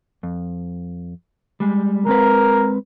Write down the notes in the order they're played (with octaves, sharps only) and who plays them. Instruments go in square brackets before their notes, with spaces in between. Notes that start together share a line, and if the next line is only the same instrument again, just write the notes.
[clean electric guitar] F2
G3 G#3
[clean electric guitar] G#3 C4 B4 [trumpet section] A#4